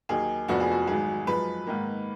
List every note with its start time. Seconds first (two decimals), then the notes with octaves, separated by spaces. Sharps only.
0.09 D#2 D#3 F#3 A#3 D#4 G#4
0.48 F1 F2 F3 B3 D4 F#4
0.60 G#4
0.71 F#4
0.87 G#1 G#2 F#3 G#4
1.27 F#2 F3 G#3 B4
1.67 G#2 D#3 A#3